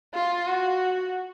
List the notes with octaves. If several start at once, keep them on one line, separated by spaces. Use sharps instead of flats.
F4
F#4